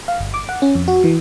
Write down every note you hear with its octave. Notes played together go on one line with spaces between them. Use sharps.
F5
G1
D6
F#5
C#4
F2
F#4
E3